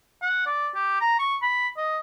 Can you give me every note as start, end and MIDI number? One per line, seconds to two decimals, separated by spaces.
0.22 0.46 78
0.46 0.69 74
0.75 0.96 67
1.01 1.18 82
1.19 1.36 85
1.42 1.68 83
1.77 2.00 75